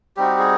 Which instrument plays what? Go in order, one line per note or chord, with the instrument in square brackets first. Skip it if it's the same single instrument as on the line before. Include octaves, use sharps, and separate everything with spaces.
[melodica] G3 C4 D#4 F#4 G4
G#4